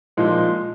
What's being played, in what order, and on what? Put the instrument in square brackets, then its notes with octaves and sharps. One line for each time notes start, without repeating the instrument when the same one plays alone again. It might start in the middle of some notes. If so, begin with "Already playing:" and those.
[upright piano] A#2 F3 G#3 D#4